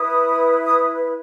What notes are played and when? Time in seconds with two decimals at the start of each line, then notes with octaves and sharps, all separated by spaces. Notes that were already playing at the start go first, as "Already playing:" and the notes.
Already playing: E4 B4 D#6
0.63 D#6